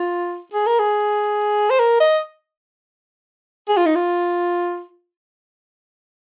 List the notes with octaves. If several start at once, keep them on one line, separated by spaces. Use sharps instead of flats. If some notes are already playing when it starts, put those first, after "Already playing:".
Already playing: F4
G#4
A#4
G#4
C5
A#4
D#5
G#4
F4
D#4
F4